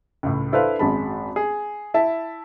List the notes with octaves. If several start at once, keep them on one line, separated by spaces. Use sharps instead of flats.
C#2 A2
D4 E4 A4 B4 C5 F5
G#1 F#2 G#3 A5 B5
G#4
E4 E5 A5